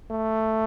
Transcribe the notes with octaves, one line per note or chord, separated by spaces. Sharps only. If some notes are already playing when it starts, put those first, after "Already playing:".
A3